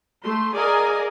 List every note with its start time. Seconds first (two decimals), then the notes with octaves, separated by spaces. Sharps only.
0.24 A3 C6
0.55 G#4 A#4 D5 D#5 F5 G#5